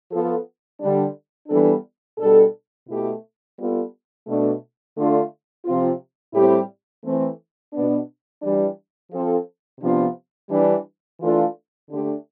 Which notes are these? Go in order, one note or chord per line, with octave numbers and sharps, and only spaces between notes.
F3 B3 F4 A4
D3 G3 D4
E3 G3 B3 D4 A4
B2 G3 D4 A4
B2 A3 E4 G4
G3 B3 F4 A4
B2 A3 D4
D3 A3 D4 F4
C3 F3 C4 F4
A2 G3 C4 E4 G4
E3 A3 C4
B2 B3 D4
E3 G3 D4
F3 C4 F4 A4
C3 F3 B3 D4 F4
E3 G3 D4
E3 A3 D4 F4 A4
D3 A3 D4 G4